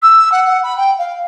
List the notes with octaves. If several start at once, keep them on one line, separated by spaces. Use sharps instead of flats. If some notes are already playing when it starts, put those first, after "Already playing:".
E6
F#5
F#5
B5
G5
F5